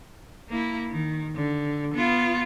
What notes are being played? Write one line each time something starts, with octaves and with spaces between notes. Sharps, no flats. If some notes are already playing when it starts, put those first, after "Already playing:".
A#3 E4
D#3
D3
B3 F4